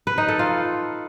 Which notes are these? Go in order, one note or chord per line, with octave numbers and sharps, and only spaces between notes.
B4
D#4
A4
F4